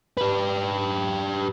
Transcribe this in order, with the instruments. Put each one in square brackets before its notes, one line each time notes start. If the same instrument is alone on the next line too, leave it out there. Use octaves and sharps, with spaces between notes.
[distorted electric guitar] G4 B4